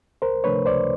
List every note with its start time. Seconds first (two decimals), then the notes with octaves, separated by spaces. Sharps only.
0.22 C#2 A#4 C5
0.44 C3 F3 A3 D4 B4 C#5
0.66 C#2 C5 D5